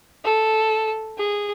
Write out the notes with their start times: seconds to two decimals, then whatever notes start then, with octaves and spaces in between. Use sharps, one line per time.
0.25 A4
1.17 G#4